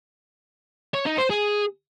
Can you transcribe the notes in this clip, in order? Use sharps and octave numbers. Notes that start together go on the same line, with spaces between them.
C#5
D#4
C5
G#4